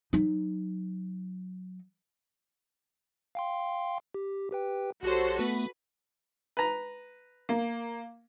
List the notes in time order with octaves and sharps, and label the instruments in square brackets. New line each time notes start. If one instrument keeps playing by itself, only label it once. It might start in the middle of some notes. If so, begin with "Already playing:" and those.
[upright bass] F#3 D#4
[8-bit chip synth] F5 G5 C6
G4
G4 B4 G5
[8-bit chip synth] A#1 G4 C#5 [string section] F#4 A4 C5
[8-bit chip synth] A3 B3 [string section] B4
[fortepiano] B4 A#5
[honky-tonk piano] A#3